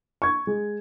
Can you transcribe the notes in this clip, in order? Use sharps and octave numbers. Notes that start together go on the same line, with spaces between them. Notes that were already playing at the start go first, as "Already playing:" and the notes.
C#6 G#6
G#3